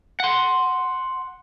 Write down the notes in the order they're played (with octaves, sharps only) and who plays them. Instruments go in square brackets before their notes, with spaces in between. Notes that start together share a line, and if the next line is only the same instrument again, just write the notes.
[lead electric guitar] F#5 C6